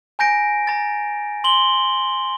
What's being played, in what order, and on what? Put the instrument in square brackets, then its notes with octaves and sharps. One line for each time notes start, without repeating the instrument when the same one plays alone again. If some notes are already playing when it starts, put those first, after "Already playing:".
[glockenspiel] G#5 A#5 G6 A#6 D7
A#5 A6
C6 F#7 G7